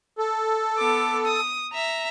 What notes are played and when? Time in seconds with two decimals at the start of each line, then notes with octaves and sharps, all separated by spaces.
0.19 A4
0.78 B3 D6
1.26 D#6
1.73 E5 A#5